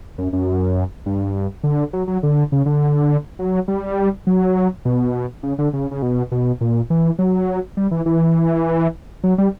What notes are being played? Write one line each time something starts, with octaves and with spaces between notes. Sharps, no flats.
F#2
F#2
G2
D3
F#3
F#3
D3
C#3
D3
F#3
G3
F#3
B2
C#3
D3
C#3
C#3
B2
B2
A#2
E3
F#3
G3
E3
E3
F#3
G3